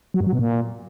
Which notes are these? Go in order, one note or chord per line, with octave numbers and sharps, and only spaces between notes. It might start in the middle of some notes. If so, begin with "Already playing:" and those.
F#3
G2
F#3
B2
A#2